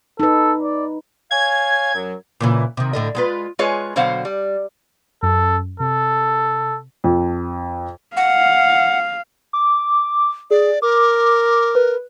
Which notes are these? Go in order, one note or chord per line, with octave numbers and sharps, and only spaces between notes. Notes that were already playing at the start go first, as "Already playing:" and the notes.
D#4 A4 B4
D5
C#5 F5 G#5 G#6
F#2 F#3
A#2 C#3 E3
C3 D#3
A2 D3 D#5
G#3 F4 B4
G#3 F4 G#4 B4 C#5
B2 D3 F#3 C5 F5 F#5
G3
F#2 A4
C3 A4
F2
F5 F#5
D6
G#4 D5
A#4 D6
B4